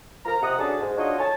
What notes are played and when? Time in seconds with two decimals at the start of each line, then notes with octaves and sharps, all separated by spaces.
0.25 F3 A#4 A#5
0.41 C3 D#5 F#5 D#6
0.58 C#4 D4 F#4 G#4 A4 A5
0.79 G#2
0.97 D4 D#4 F4 F#4 C#5 D#5
1.18 C#5 G#5 A5